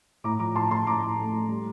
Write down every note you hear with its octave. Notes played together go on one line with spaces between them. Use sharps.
A2 A#5 D6
F3 A#5 D6
A2 A5 C6
A2 A5 C6
A2 A#5 D6
A2
A3
A3
G3